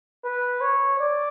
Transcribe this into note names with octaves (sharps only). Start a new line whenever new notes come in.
B4
C#5
D5